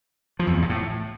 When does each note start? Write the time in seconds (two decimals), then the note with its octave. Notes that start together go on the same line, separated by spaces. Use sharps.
0.39 F3
0.47 F2
0.54 E2
0.62 A#2
0.69 A2